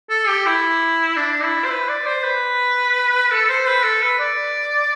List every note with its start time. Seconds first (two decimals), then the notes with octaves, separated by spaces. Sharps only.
0.10 A4
0.28 G4
0.46 E4
1.17 D4
1.43 E4
1.65 C5
1.70 B4
1.89 D5
2.06 C5
2.23 B4
3.31 A4
3.49 C5
3.67 B4
3.84 A4
4.02 B4
4.19 D5